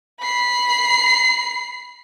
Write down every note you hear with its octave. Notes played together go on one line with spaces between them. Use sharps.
B5 C7